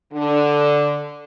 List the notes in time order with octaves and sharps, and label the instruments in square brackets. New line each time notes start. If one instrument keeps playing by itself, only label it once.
[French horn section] D3